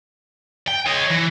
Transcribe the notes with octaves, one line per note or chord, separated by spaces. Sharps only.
G5
C#5 D#5
E3